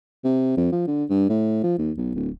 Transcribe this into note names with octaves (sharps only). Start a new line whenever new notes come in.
C3
F2
F3
D3
G2
A2
F3
D#2
B1
D1